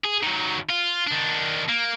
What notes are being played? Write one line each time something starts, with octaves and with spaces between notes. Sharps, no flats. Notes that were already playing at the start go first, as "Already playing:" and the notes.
G#4
D#3 F#3
F4
D#3 D4
A#3